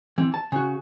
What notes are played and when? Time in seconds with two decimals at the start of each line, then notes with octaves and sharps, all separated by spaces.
0.18 E3 C4
0.34 A5
0.52 C#3 F#4 G#5